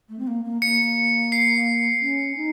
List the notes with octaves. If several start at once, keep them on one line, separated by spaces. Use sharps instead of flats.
A3
C4
A#3
A#3
A#3 C#7
C7
C#4
D#4